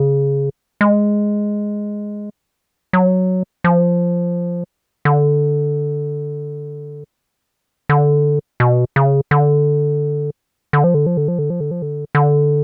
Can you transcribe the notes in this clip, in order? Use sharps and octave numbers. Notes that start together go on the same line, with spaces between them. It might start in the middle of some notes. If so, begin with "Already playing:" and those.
Already playing: C#3
G#3
F#3
F3
D3
D3
B2
C#3
D3
D3
F3
D3
F3
D3
F3
D3
F3
D3
F3
D3
D3